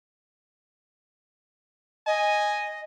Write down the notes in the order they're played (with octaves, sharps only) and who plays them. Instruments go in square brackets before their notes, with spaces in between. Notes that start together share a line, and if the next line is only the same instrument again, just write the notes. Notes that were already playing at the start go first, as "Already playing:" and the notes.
[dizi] D#5 [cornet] G#5